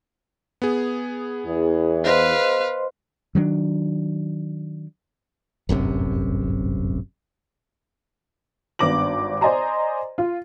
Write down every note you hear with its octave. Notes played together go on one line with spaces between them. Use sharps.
B3 G#4
E2
B4 C5 D#5 F5 C6
D#3 F#3 A3 D4
D1 G1 F#2 C3
G#1 G2 B3 D6 A#6 F#7
C5 D5 D#5 G#5 A#5 C6
F4